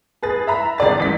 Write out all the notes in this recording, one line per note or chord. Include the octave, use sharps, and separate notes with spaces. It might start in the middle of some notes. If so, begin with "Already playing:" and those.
G#4 B4 A6
E5 A#5 B5
G1 G#4 D5 A6
A1 B6